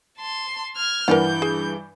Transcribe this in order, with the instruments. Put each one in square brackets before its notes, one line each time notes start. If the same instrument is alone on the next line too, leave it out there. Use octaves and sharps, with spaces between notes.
[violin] A5 C6
F6 G#6
[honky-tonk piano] G2 E3 [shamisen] A#4 D5 F#5 [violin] G6
[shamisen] G#4